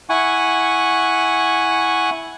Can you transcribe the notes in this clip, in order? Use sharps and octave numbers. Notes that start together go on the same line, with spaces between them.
E4 F#5 G#5 C#6